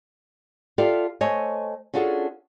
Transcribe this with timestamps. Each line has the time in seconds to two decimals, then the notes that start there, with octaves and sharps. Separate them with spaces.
0.78 F4 G4 A4 D5 E5 F5
1.21 A3 C5 C#5 D#5 G#5
1.94 C#4 D4 F4 F#4 G#4 A4